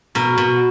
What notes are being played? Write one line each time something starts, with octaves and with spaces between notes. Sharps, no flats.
B2 A#4
B2